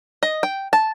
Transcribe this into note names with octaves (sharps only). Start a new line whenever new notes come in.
D#5
G5
A5